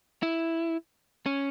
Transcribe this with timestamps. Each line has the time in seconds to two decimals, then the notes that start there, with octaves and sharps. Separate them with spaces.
0.23 E4
1.26 C#4